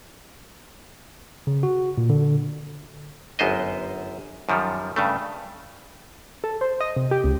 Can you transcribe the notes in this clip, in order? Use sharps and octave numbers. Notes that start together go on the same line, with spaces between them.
C#3
F#4
A#2
D3
G1 F#2 B3 C5 D#5
F#2 D#3 F3 G3
G2 C#3 A3
A4
C5
D#5
C3
G4
C#2